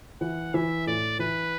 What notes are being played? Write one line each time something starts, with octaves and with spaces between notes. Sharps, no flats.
E3 F#5
E3 E5
A2 D5
E3 B4